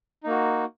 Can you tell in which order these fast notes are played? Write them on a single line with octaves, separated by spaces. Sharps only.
D#4 A#3 F#4